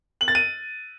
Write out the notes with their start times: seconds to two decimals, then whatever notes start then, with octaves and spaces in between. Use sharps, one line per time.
0.21 F#7
0.28 A6
0.35 D#7